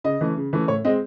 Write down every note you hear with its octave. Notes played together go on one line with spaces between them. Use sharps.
C#3 D#5
E3 A3 C#4
C#3
E3 A3 C#4
A2 C#5
G#3 C4 D#5